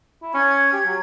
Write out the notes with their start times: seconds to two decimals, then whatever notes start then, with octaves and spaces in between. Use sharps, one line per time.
0.23 E4
0.34 C#4 G#6
0.73 G4
0.86 F#3